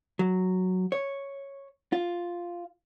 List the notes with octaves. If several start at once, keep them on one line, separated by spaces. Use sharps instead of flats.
F#3
C#5
F4